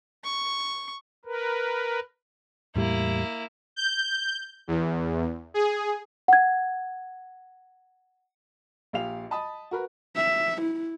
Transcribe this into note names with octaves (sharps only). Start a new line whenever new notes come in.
C#6
A#4 B4
E2 A2 G3 A#3 E4
G6
E2
G#4
F#5 G#6
A#1 G4 F5 F7
D#5 A5 B5 D#6
F#4 A#4 B4
E5
E4